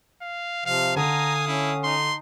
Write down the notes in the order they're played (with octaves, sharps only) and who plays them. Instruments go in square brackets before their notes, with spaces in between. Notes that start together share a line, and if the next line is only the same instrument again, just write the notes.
[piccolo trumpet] F5
[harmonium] C3 F3 [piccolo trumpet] F5
[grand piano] D3 [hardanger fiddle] F5 D#6 [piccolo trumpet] G#5 [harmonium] A#5
[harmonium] C#4 [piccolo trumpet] E4
[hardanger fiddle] D#4 [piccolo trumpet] C6